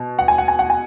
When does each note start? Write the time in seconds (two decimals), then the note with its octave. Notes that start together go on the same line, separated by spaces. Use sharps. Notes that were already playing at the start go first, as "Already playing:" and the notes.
Already playing: B2
0.19 F#5
0.28 G#5
0.38 F#5
0.48 G#5
0.59 F#5
0.70 G#5